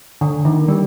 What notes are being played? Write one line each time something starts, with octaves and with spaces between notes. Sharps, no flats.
D3
D#3
G3